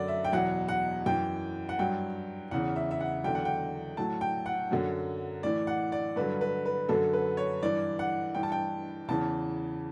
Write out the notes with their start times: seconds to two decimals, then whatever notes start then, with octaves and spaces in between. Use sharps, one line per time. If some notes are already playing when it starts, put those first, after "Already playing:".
Already playing: F#2 D3 F#3 D5
0.08 E5
0.24 G5
0.32 E2 B2 F#3 F#5
0.68 F#5
1.06 F#2 E3 G5
1.69 F#5
1.79 G2 F#3 G5
2.51 E2 C#3 E3 F#5
2.76 E5
2.91 E5
3.01 F#5
3.24 E2 D3 F#3 G5
3.35 F#5
3.45 G5
3.97 A2 F#3 A5
4.21 G5
4.46 F#5
4.71 F#2 D3 F#3
5.43 A2 E3 D5
5.67 F#5
5.92 D5
6.16 G2 D3 F#3 B4
6.41 B4
6.65 B4
6.89 F#2 D3 F#3 A4
7.13 B4
7.37 C#5
7.62 G2 E3 D5
7.99 F#5
8.35 G2 E3 G5
8.43 A5
8.52 G5
9.08 E2 C#3 E3 A5